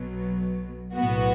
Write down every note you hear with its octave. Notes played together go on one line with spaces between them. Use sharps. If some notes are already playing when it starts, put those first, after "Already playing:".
Already playing: B1 B2 F#3
B1 A2 F#3 B3 F#4